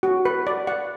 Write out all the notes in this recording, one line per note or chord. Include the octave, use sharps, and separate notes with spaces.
F#4
B4
D5
F#5